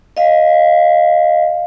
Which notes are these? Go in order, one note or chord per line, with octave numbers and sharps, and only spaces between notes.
D#5 F5